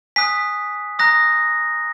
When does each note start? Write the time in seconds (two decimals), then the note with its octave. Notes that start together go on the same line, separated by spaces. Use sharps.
0.16 G#5 D#6 F#6 B6
0.99 A#5 D#6 F#6 A#6